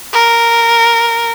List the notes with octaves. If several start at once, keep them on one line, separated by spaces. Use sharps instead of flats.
A#4